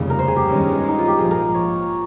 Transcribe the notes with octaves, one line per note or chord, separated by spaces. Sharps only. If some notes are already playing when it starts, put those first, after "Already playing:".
Already playing: F1 D#2 C#3 G3
A#4
C5
G#4
G4
G1 G2 D#3 G#3 C#4
D#4
F4
G4
A#1 G#2 F3 G#4
A#4
C#5